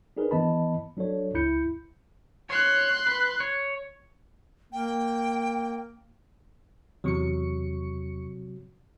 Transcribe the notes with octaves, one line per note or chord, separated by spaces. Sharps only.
D4 D#4 G#4 A#4 B4
E3 B3 D#5 A5 B5
F#3 D4 A4 C#5
C#2 E4 B5 G6 C#7
C#5 C6 F#6
B4
C#5
A#3 G5
E2 C3 F#3 C#6 C#7